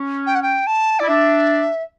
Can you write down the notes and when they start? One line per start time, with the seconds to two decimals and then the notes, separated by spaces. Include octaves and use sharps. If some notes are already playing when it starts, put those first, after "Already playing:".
Already playing: C#4
0.26 G5
0.35 F#5
0.42 G5
0.67 A5
0.99 E4 D5
1.08 D4 E5